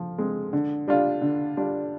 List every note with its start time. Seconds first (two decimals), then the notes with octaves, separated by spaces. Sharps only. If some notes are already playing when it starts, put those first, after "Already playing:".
Already playing: F3
0.18 G#3 C4
0.53 D3
0.88 G3 D4 F4
1.22 D3
1.57 G3 D4 F4